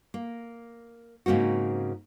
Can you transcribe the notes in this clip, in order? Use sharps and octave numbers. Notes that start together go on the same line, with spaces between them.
A#3
G#2 C#3 A#3 C4 F#4